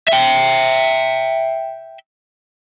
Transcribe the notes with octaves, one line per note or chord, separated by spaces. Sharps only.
E5 G5